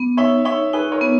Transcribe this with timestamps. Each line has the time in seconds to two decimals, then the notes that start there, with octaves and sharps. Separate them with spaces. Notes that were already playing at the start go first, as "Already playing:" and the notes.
Already playing: B3
0.17 D#4 C#5 E5
0.45 D#4 C#5 E5
0.73 D#4 G#4 B4
0.92 A#4 C#5
1.01 B3